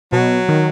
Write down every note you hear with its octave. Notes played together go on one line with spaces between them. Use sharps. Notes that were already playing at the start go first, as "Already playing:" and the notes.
B2 F#3
D#3